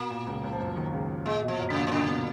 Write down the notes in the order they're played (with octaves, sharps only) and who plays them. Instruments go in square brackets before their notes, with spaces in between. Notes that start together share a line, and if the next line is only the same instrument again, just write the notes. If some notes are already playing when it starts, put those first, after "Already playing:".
Already playing: [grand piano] B2 [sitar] A#3
[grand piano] A#2
C#2 C#3
C#2 C#3
F3
F#2 F#3
F3
D#2 D#3
C#2 C#3
[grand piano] A#2 [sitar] G#3
[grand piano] B2
[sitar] F3
[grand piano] F#2 F#3
[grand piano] A#2 A#3 [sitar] C#3
[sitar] B2
[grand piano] A#2 A#3 [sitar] C#3
[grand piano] B2 B3